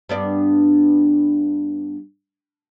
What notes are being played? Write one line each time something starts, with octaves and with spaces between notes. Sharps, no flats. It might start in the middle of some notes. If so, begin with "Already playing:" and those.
G2 B3 D5